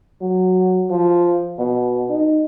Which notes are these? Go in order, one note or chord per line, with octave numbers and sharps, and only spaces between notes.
F#3
F3
B2
D#4